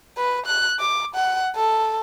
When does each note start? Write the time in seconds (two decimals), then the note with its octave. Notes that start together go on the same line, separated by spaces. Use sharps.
0.17 B4
0.46 F#6
0.80 D6
1.15 F#5
1.56 A4